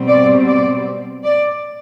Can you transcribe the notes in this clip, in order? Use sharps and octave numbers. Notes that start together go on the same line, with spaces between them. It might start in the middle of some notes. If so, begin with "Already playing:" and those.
Already playing: B2 G3 C4
D5
D5
D5